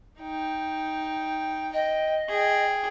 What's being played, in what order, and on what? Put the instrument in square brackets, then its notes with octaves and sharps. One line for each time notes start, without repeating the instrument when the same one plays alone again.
[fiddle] D#4 G5
[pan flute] D#5 [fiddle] G5
[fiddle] G#4 G5